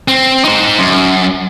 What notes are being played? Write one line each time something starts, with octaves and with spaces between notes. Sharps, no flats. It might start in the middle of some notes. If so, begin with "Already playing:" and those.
C4
D#4 C5
F#2